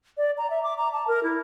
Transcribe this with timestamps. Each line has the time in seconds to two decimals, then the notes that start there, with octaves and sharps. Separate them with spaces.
0.17 D5
0.38 A#5
0.50 E5
0.63 D6
0.78 A#5
0.93 A5
1.08 A#4
1.23 E4